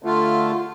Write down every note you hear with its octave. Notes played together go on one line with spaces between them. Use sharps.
D3 A3 F4